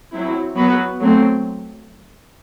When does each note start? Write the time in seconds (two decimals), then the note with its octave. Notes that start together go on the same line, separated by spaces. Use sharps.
0.13 F#3 C4 E4
0.56 F#3 B3 F#4 B4
0.99 F#3 A3 C4